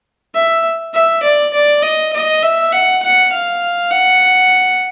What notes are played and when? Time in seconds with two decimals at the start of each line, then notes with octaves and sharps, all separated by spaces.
0.34 E5
0.94 E5
1.23 D5
1.53 D5
1.83 D#5
2.13 D#5
2.43 E5
2.72 F#5
3.03 F#5
3.32 F5
3.91 F#5